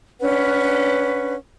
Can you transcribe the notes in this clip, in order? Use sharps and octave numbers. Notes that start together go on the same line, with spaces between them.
C#4 D4 B4 F#5